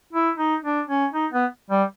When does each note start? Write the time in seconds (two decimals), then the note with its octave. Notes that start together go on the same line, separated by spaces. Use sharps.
0.13 E4
0.38 D#4
0.63 D4
0.88 C#4
1.13 D#4
1.33 B3
1.70 G3